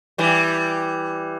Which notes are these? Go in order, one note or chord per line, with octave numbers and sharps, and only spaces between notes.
E3 G3